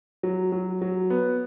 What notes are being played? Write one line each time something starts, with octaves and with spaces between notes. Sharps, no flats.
F#3
F#3
F#3
B3